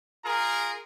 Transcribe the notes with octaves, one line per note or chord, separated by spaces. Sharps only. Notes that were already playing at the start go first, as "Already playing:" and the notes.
F4 G#4 A#4 A#5